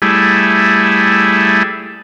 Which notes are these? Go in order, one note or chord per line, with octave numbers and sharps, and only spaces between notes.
G3 A3 E4 G#4